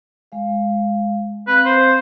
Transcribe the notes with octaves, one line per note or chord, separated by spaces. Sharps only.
G#3 F5
C4 B4 F5 B5
C5